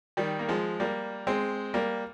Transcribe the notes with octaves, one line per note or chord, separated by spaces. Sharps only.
D#3 G3
A#3
F3 G#3
G3 A#3
G#3 C4
G3 A#3